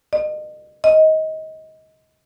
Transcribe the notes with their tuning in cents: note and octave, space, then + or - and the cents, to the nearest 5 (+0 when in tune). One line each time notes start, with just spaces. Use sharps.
D#5 -35
D#5 +20